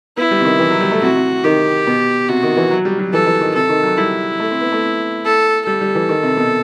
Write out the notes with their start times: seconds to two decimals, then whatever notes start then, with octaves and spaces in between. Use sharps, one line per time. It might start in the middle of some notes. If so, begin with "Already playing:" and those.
0.17 B3 E4
0.31 G3
0.41 C3
0.45 D#3
0.59 E3
0.70 F#3
0.80 G3
0.91 A3
1.01 C3 F#4
1.16 C3
1.44 D#3 G4
1.87 B2
2.29 C3 F#4
2.43 D#3
2.57 E3
2.71 F#3
2.85 G3
2.99 F#3
3.13 E3 A4
3.27 E3
3.41 D#3
3.55 C3 A4
3.69 D#3
3.83 F#3
3.98 G3 E4
4.39 A3
4.51 C4
4.61 B3
4.72 A3
5.25 A4
5.66 G3 A4
5.81 G3
5.95 E3
6.09 D#3
6.23 C3
6.37 B2